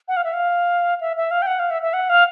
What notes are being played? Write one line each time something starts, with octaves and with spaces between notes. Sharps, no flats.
F#5
F5
E5
F5
E5
E5
F5
G5
F#5
F5
E5
E5
F#5
F5